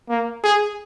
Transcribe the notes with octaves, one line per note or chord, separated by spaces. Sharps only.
A#3
G#4